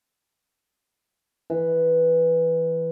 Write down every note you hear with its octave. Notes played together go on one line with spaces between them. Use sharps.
E3